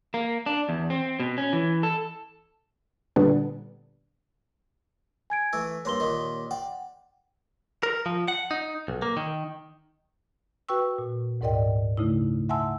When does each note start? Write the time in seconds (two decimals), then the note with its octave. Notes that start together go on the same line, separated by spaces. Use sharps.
0.14 A#3
0.46 D4
0.69 E2
0.90 C4
1.20 B2
1.38 C#4
1.53 E3
1.83 A4
3.16 A#2 D3 G3 B3 D4
5.30 G#5 G#6 D7
5.53 E3 A3 E6
5.85 G2 A#3 C#5 C6 G7
6.00 D#2 A#2 D#3
6.51 D5 F#5 G5
7.83 A#4
8.06 F3
8.28 F#5
8.51 D#4
8.88 B1
9.02 A#3
9.17 D#3
10.69 F#4 B4 G5 C#6 E6
10.98 A#2
11.41 D2 G#2 A#4 D5 D#5 G5
11.97 C#3 A3 D#4 E4
12.49 E5 F#5 G#5 A5 C6 E6